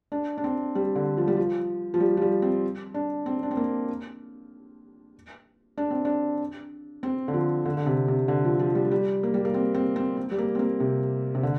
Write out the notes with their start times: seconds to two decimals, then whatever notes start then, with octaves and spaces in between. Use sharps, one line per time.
0.12 D4
0.38 D4
0.44 C4
0.75 G3
0.95 D3
1.17 F3
1.28 G3
1.37 F3
1.94 F3
2.00 G3
2.17 F3
2.22 G3
2.42 C4
2.94 D4
3.26 C4
3.43 D4
3.51 C4
3.57 A#3
5.78 D4
5.91 C4
6.05 D4
7.03 C4
7.28 D3
7.34 F3
7.65 D3
7.77 D3
7.86 C3
8.08 C3
8.28 D3
8.45 F3
8.59 F3
8.75 G3
8.91 G3
9.23 A#3
9.34 G3
9.45 A#3
9.54 C4
9.75 C4
9.96 C4
10.17 C4
10.31 G3
10.38 A#3
10.55 C4
10.59 A#3
10.80 C3
11.35 C3
11.43 D3